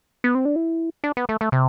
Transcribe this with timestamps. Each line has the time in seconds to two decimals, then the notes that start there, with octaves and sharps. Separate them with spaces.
0.24 B3
0.35 C4
0.45 D4
0.56 E4
1.04 D4
1.17 B3
1.29 A3
1.41 A3
1.52 C3